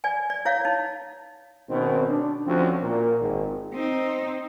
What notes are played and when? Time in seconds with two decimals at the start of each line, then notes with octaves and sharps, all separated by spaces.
0.04 D5 G#5
0.30 D5
0.45 E4 C#5 F5
0.65 D#4
1.69 G#1 B2 D#3 C4 C#4
2.08 D4
2.46 D2 F3 C4 C#4 F#4
2.82 A#2 A#4
3.21 G#1
3.74 C4 D#4